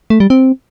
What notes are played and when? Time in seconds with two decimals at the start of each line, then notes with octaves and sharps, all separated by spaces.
0.10 A3
0.20 G3
0.30 C4